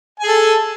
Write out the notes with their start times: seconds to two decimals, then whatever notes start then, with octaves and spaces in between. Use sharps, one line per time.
0.20 G#5
0.23 G#4
0.27 A4